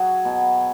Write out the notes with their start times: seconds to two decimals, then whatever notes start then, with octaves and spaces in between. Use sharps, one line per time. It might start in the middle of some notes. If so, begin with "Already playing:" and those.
Already playing: F#3 F#4 G#4
0.25 B2